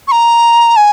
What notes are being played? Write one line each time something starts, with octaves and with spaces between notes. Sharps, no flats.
C#6
A#5
G#5